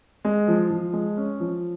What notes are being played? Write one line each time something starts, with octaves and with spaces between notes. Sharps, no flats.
G#3
F3
F3
G#3
C#4
F3